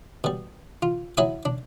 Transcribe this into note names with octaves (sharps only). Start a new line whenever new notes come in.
B2 G3
F4
F#3 E4 E5 G#5 D#6
D4